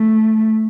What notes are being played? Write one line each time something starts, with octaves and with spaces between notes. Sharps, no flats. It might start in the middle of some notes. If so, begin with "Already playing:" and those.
Already playing: A3